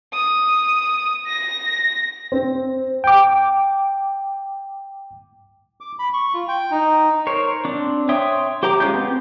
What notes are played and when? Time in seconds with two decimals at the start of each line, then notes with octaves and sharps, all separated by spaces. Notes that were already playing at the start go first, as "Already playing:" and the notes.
0.14 D#6
1.27 A#6
2.32 C4
3.04 G5 D6
5.81 D6
5.99 B5
6.14 C#6
6.34 F4
6.48 G5
6.71 D#4
7.27 A#4 C5 C#5
7.65 C4 D4
8.09 C#5 E5 G5 C6 D#6
8.63 G4 C5 G5 A#5 D6
8.80 G#3 C#4 F4 G6
8.94 B3 C4